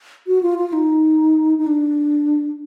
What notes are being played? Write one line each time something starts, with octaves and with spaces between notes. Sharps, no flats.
F#4
F4
F4
D#4
D#4
D4